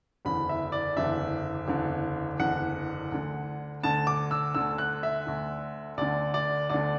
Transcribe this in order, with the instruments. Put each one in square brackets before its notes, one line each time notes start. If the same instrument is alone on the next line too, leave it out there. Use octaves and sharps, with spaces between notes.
[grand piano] F#1 E2 D3 B5
E5
D5
F#1 E2 D3 E5
F#1 E2 D3
F#1 E2 D3 F#5
D2 D3
D2 D3 A5
D6
E6
D2 D3 E6
F#6
E5
D2 D3
D2 D3 D5
D5
D2 D3 D5